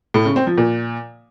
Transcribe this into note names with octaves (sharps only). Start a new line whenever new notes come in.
A2
C#3
C4
F3
A#2